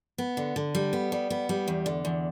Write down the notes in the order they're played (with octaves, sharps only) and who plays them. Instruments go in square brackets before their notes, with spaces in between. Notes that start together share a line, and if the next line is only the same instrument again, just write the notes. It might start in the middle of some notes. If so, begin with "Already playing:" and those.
[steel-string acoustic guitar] B3
D3
D3
G3
B3
G3
B3
G3
E2
D3
E2